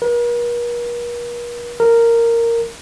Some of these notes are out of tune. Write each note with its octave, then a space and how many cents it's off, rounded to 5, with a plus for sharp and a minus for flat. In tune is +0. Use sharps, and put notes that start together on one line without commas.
A#4 +45
A#4 -10